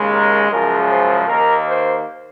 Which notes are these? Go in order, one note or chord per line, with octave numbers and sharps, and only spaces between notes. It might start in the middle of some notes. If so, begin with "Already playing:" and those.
Already playing: D#2 C#3 G#3
A#4
F#2 C#3 F3 G#3 A#4
C5
D#2 D#3 A#3 A#4
C5